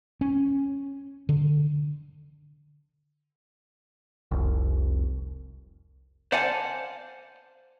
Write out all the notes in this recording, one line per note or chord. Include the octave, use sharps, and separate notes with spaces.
C#4
D3
F1 C2
C5 D5 F5 F#5 G#5 A5